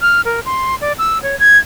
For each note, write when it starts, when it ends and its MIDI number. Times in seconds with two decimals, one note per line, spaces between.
0.01 0.21 89
0.25 0.40 70
0.46 0.75 84
0.81 0.93 74
0.99 1.21 88
1.23 1.38 73
1.40 1.58 92